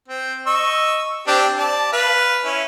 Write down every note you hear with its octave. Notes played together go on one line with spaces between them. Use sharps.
C4
D#5 C#6 E6
C4 D4 G4
D5 A5
B4 F5
C#4 E4